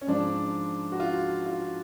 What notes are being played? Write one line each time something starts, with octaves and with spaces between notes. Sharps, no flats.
C#4
G#2 F3 D4
F#4
F4
F4